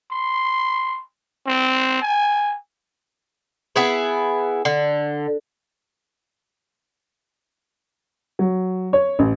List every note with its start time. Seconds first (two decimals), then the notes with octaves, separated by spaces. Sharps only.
0.11 C6
1.47 C4
2.02 G#5
3.76 B3 E4 G#4 B4
4.65 D3
8.39 F#3
8.93 C#5
9.19 A1